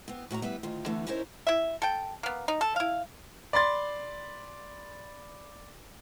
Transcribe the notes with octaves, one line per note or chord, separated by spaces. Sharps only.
B3 C4
A2 F#4 F#5 A#5
G3 B3 B4 E5
D2 D#3 F4
D3 E3 A3 B3
C#4 D#4 E4 A#4 C5 C#5
E4 E5
A4 G5
A#3 B3
D#4
A4
E4 F5
D5 B5 C6 A6